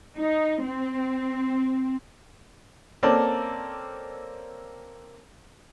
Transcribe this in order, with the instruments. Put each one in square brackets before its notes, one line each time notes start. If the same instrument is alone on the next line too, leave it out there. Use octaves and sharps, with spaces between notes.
[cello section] D#4
C4
[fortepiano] A#3 C4 C#4 A4 D5 A5